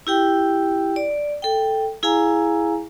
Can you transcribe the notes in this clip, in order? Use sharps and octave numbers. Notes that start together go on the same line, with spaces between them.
E4 G4 G5
D5
A4 G5
E4 G#4 F5 G#5 A#5